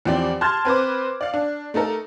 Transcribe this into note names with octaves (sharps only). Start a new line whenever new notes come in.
E2 F3 C4 G4 D5
A5 C6 F6 G#6 A6
C4 B4 C5 D6
D5 F5
D4
A3 D#4 A4 A#4